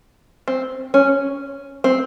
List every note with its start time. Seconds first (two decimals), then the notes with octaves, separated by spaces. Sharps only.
0.48 C4
0.94 C#4
1.84 C4